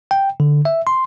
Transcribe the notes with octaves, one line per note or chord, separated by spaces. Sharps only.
G5
D3
E5
C6